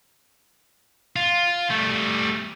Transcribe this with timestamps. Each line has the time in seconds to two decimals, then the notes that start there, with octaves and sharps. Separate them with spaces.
1.16 F4
1.70 G3 A3